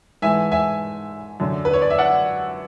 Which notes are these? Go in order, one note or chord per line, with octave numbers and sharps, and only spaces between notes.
G#2 E3 A3 E5 G#5
E5 G#5
F#2 D3 A3
B4
C#5
D5
E5
D5 F#5